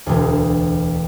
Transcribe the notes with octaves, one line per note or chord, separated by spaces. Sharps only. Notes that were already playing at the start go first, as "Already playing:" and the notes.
E1 D2